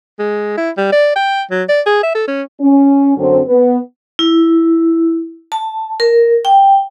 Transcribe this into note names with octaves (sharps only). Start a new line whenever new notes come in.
G#3
E4
G3
D5
G5
F#3
D5
G#4
E5
A4
C#4
C#4
F#2 D3 F#3 C4
B3
E4
A5
A#4
G5